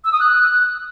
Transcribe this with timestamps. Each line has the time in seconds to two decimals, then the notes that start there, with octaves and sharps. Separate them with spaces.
0.05 E6
0.12 D#6
0.20 F#6